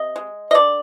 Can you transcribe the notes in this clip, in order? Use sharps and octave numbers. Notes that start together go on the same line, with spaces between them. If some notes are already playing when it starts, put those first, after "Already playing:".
Already playing: C3 D#5
G#3
D#5
D3 D5